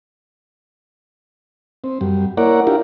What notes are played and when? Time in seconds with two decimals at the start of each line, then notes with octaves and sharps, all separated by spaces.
1.84 C4
2.01 F#2 G3
2.37 A#3 E4 A#4 C#5 D5 F#5
2.67 D4 E4 F4 G4 A#4